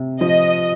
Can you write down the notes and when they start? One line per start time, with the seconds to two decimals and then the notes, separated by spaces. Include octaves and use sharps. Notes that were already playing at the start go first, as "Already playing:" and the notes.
Already playing: C3
0.21 F3 D#5